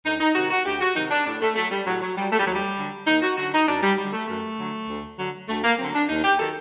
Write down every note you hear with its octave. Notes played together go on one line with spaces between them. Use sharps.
D2 D#4
D#4
C3 D#3 F#3 F#4
F#4
D2 G4
F#4
C3 D#3 F#3 D#4
D4
A2 D4
A3
F#3 A3
G3
A2 F#3
F#3
F#3 G3
A3
G3
D#2 F#3
G3
D3 F#3
D#2 D#4
F#4
D3 F#3 F#4
D#4
F#2 D4
G3
D3 F#3 G3
A3
F#2 A3
D3 F#3
D2
D3 F#3
D2 A3
A#3
D3 F#3 C4
D4
D#2 D#4
G4
D#3 F#3 A4